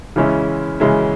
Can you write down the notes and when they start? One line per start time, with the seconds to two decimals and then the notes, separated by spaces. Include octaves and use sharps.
0.16 C#3 E3 G#3 C#4 E4
0.80 C#3 E3 G#3 C#4 E4